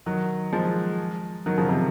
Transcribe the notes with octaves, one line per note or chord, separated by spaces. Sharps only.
D#3 F#3
F3 G#3
D#3 F#3
C#3 F3
C3 D#3